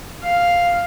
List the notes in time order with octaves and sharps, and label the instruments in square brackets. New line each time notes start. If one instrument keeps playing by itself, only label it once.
[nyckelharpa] F5